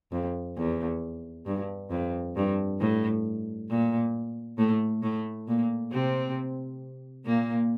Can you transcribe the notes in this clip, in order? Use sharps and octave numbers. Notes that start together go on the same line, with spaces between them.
F2
E2
G2
F2
G2
A2
A#2
A2 A3
A2 A3
A#2 A#3
C3 C4
A#2 A#3